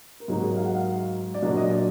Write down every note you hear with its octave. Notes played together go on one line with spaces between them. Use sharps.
A#4
G#2 F#3 A#3 D#4 G#4
G#4
D#5
F5
F#5
F5
D5
A#2 F#3 D4 D#5
D#5
D5